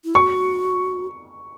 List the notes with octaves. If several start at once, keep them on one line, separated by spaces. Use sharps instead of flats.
E4
F#4 C#6